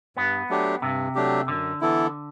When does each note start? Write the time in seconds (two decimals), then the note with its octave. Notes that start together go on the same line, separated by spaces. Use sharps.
0.17 G2 B3
0.49 F#3 A3 D4 G4
0.82 G2 C3
1.15 F#3 A3 D4 G4
1.47 F#2 D3
1.81 E3 B3 E4 A4